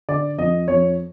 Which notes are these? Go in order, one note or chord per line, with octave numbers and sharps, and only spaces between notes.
D3 D5
F2 D#5
F2 C#5